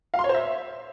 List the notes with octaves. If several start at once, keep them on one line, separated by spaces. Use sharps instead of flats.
F5
C6
C#5
C5
E5